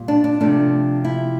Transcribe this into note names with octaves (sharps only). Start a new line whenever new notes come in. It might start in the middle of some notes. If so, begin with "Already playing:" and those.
Already playing: A#2 G3
D4
D4
C3 F3 A3 D4
E4